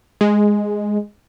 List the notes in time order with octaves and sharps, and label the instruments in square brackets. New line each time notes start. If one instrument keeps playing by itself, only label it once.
[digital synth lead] G#3